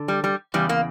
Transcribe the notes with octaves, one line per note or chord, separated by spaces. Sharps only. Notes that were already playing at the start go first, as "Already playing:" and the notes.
Already playing: D3
G3
G3
E2 C#3 G3
A#3